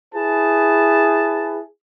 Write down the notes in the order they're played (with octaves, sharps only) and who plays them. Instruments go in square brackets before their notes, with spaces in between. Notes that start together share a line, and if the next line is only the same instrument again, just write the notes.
[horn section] E4 G#4 B4 A5